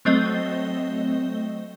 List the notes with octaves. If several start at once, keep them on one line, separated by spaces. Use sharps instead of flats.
F#3 A3 C4 D#5 G7